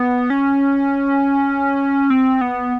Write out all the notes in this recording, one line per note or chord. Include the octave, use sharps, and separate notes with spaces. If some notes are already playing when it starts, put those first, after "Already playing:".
Already playing: B3
C#4
C4
B3